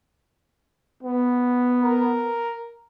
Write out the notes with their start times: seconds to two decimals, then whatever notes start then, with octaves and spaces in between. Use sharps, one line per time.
1.03 B3
1.84 A#4